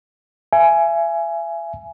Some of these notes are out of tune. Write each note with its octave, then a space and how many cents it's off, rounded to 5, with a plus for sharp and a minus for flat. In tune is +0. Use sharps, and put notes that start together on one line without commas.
E5 +35 G#5 +10